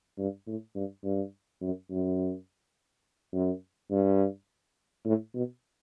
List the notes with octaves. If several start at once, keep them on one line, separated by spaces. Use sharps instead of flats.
G2
A2
G2
G2
F#2
F#2
F#2
G2
A2
B2